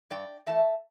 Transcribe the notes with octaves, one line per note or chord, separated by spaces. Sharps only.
G2 D5 G5
E3 A3 E5 A5